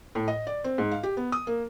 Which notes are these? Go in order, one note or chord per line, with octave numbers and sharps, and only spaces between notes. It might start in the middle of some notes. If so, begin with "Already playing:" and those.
A2
D#5
D5
C4
G#2
F5
G4
B3
D#6
A#3